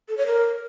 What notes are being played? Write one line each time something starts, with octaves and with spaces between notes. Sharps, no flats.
A4
C#5
A#4